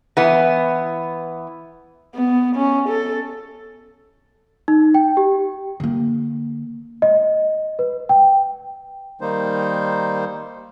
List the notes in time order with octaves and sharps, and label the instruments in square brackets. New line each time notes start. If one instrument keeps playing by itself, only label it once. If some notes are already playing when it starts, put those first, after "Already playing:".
[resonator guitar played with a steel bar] E3 B3
[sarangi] B3
C#4
A4
[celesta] D#4
G5
G4
[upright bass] D3 A#3
[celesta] D#5
B4
G5
[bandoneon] D#3 G3 A#3 D#4 C5